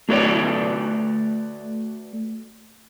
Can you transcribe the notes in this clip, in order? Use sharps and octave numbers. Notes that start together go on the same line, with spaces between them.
A3 F#4 B4 C#5 D5